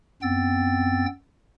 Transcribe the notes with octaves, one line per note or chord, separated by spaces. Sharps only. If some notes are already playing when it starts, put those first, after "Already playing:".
F#2 B3 C4 G5 E6 A6